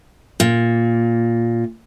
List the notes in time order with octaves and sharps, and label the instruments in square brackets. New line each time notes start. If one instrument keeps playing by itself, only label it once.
[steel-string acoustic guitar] A#2